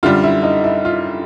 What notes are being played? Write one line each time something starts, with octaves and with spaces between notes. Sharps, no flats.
F#2 D3 G3 F4
E4
D#4
E4
F4